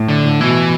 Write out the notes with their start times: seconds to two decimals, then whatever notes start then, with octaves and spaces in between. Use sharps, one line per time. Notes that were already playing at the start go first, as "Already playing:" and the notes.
Already playing: A2
0.08 D3
0.40 B2 E3